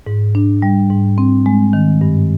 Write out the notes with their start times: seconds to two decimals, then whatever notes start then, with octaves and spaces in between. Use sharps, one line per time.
0.07 G#2
0.35 D4
0.62 G3
0.90 G#2
1.18 C4
1.46 G#3
1.73 D#3
2.01 G2